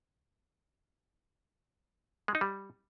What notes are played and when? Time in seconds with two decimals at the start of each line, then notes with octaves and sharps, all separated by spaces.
2.28 G#3
2.35 D#4
2.41 G3